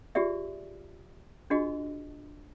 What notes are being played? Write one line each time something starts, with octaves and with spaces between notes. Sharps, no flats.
F4 G4 G#4 D5 E5
D4 F4 F#4 G#4 D#5